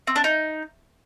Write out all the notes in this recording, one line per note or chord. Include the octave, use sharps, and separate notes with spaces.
C4
D4
D#4